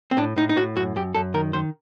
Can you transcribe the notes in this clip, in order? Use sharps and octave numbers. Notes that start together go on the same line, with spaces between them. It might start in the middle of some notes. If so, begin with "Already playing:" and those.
C4
A2 D4
A2 D#4
D#4
A2 F#4
F#2 F#4
F#2 G4
F#2 A4
D#3 A#4
D#3 C5